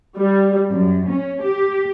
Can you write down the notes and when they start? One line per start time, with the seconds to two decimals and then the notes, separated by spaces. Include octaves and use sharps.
0.17 G3
0.69 F#2
1.09 C#4
1.42 G4